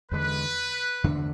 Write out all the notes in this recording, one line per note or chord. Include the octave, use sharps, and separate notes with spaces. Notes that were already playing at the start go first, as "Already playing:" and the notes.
E2 D3 G#3 B4
E2 D3 A3 D4